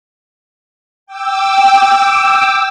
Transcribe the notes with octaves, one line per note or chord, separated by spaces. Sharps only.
G5 D6 E6